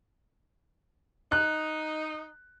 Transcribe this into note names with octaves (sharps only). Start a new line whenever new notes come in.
D#4 F#6